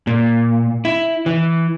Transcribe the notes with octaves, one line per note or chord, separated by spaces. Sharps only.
A#2
E4
E3